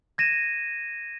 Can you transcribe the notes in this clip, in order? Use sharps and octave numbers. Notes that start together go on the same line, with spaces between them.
G#6 A#6 D#7 E7